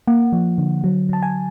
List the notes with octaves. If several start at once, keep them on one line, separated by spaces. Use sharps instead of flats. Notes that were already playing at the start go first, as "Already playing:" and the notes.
A#3 F#5
F3
D3
F#3
F#3 A5
G#5